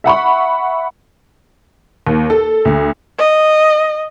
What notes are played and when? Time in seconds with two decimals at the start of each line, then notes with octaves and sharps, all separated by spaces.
0.04 E5 F#5 B5 C#6
2.07 D#2
2.30 A4
2.65 D2
3.18 D#5